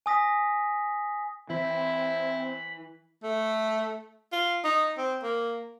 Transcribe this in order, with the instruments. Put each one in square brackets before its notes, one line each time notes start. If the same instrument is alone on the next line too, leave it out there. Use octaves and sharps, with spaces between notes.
[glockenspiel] G#5 D#6 A#6 B6
[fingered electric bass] E3 [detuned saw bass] C4 [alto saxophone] E4 [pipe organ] B5
[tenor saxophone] A3
F4
D#4
C4
A#3